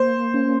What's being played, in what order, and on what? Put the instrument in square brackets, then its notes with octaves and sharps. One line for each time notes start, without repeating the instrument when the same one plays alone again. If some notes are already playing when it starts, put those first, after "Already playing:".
Already playing: [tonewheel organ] A#3 [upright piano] C5
[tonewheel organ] C#4